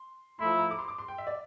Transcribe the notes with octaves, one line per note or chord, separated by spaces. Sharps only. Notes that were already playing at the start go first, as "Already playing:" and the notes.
Already playing: C6
F3 A3 E4 C6
A#5
D6
C6
D6
C6
G5
E5
D5